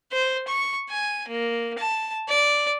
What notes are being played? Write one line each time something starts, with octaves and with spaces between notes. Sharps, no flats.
C5
C#6
G#5
A#3
A5
D5